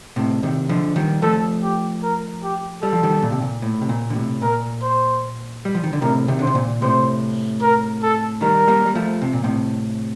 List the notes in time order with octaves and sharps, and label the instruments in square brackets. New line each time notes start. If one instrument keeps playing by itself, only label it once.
[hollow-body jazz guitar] A2 C3
C3 D#3
D3 F3
D#3 G3
[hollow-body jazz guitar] F3 A3 [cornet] A4
[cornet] G4
A#4
G4
[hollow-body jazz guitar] G3 [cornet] A4
[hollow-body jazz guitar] F3
D#3 G3
A#2
C3
A#2
A2
C3
A#2
D3
A2 C3
[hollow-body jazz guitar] A#2 [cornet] A#4
[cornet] C5
[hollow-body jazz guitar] G3
F3
D#3
D3
[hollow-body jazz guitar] A2 C3 [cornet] A#4
[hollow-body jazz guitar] C3 D#3
[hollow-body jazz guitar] D3 [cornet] C5
[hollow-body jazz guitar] C3
A#2
[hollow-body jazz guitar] A2 C3 [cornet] C5
[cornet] A#4
A4
[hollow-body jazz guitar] D#3 G3 [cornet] A#4
[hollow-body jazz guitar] G3 A#3
G3
F3 A3
C3
A#2
A2 C3